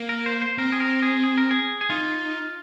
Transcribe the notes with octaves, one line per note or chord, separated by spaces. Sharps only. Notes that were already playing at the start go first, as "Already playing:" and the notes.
Already playing: A#3
A#4
C5
C5
C4 A#4
G#4
A#4
G#4
G#4
A#4
G#4
G#4
D#4 F4